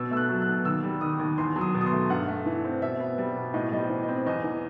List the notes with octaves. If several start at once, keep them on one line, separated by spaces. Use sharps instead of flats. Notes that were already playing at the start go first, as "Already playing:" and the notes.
Already playing: B2 B3 E6
A3 E6
F#6
F#3
B2 F#6
D#2 E6
G3
D#3 D#6
D#2
E2 C6
F#3
D#6
B2
D#6
C6
A3
G2 F#5
A3
E3
C4
B2 E5
B3
G3
B2
A2 D#5
G3 D#5
C5
E3
D#5
C4
E2 D#5
E3